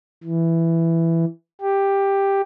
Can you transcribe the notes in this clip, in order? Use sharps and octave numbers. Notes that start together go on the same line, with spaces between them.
E3
G4